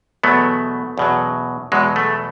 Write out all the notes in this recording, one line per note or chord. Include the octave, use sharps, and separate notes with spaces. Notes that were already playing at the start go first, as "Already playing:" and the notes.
E2 B2 F#3 A3 B3
E2 B2 F#3
E2 B2 F#3 G#3
A3